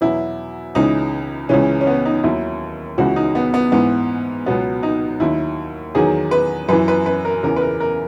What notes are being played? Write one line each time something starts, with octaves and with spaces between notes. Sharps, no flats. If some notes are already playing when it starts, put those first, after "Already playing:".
E2 B2 F#3 E4
C#2 C#3 E3 D#4
C#2 C#3 E3 C#4
C#4
B3
D#4
D#2 D#3 F#3 E4
C#2 C#3 E3 F#4
D#4
B3
B3
G#2 E3 B3
C#2 B2 F#3 B3
D#4
D#2 D#3 F#3 E4
E2 D#3 F#3 G#4
B4
F#2 E3 B4
B4
B4
A#4
E2 C#3 E3 A#4
B4
A#4
A#4